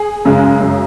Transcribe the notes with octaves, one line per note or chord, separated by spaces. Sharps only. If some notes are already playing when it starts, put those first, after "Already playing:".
Already playing: G#4
F#2 C#3 G#3
F#2 C#3 G#3